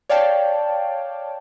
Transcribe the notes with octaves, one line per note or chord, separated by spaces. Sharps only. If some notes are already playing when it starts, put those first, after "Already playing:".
C#5 D5 F5 G5 A5